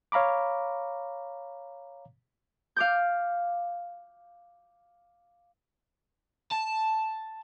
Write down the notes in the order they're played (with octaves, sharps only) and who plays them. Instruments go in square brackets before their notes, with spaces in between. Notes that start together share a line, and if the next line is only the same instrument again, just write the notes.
[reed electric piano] C#5 F5 A#5 B5 D6
[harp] F5 D6 G6
[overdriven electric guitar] A5